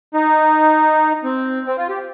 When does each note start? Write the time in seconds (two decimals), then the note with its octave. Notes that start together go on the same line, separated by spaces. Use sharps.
0.14 D#4
1.24 C4
1.67 C4
1.78 F4
1.89 G4